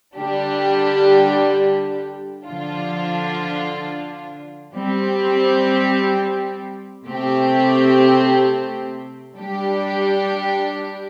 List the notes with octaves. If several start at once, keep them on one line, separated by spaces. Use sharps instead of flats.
D3 G3 D4 G4
D3 F3 D4 F4
G3 C4 G4
C3 A3 C4 G4
G3 D4 G4